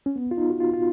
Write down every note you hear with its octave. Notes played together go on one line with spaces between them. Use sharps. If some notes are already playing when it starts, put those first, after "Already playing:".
C#4
B3
F4
D#4
F#4
F4
F4